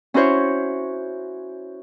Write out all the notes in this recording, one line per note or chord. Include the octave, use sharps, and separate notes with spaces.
C#4 E4 F#4 C5 C#5